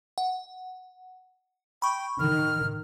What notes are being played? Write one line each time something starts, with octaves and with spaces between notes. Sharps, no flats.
F#5
G5 B5 C#6
D#3 F6